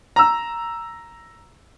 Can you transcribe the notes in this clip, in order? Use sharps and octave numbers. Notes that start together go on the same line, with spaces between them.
A#5 E6